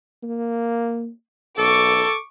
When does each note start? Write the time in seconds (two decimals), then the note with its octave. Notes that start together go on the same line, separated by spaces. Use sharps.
0.23 A#3
1.58 B1 A4 C#6 D6